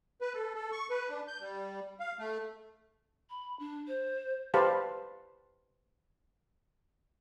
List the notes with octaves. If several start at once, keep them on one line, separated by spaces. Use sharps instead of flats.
B4
A4
A4
C#6
B4
D4
G6
G3
F5
A3
B5
D4
C5
G4 B4 C5 F5 A5